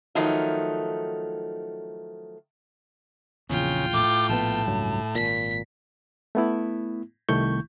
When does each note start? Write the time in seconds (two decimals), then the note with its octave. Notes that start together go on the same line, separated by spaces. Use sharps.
0.15 D#3 F3 F#3 A3 D#4
3.50 A#1 E2 C#3 F4 G5
3.93 A2 D6
4.29 A#1 D3 B3 A5
4.66 C#2 G2 F#3
5.15 G#1 A#2 B6
6.35 A3 B3 E4
7.29 C2 D#3 A3 E4 C#6 G6